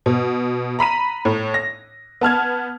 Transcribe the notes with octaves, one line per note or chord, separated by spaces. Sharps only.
B2
A#5 B5 B6 D#7
A2
A#6
B3 A5 F6 G#6